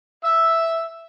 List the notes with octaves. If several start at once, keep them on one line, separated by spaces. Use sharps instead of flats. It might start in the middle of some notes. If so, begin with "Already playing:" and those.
E5 E6